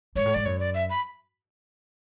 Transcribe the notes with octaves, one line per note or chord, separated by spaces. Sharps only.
G#2 C#5
A2
G#2 D5
F#2 C#5
D5
E5
B5